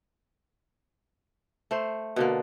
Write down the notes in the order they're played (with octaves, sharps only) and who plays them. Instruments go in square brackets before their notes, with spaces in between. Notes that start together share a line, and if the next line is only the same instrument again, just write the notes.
[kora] A3 C5
B2 D3 A#3